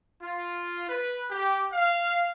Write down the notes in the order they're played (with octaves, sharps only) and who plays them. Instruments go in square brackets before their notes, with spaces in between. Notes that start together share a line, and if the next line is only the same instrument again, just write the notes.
[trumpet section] F4
B4
G4
F5